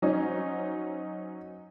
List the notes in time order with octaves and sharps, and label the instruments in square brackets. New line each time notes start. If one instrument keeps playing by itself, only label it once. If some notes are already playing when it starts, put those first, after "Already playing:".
[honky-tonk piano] F#3 C#4 D#4 C5